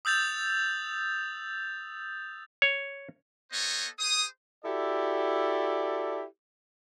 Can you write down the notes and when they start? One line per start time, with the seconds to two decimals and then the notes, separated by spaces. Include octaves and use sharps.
0.05 D#6 E6 G6 A6 F7
2.62 C#5
3.52 B3 A4 C5 C#5 D#5
3.99 G#4 C5 D#6
4.63 E4 F#4 G4 A4 D5